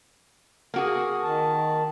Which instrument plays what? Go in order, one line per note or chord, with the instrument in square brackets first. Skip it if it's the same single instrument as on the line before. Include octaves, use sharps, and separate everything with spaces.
[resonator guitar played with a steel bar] A#3 F#4 G#4
[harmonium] D#3 A5